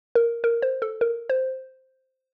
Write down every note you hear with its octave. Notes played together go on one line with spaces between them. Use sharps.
A#4
A#4
C5
A4
A#4
C5